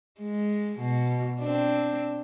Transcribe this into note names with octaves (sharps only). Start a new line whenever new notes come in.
G#3
B2
C4 D4